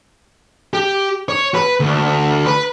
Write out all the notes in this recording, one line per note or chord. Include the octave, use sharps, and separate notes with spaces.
G4
C#5
B4
D2
B4